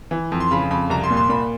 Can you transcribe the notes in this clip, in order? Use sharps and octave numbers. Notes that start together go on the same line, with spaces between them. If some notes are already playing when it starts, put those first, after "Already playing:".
E3
F2
C6
C#3 B5
F2 B5
C2 A#5
C6
A#2
C6
A#2 B5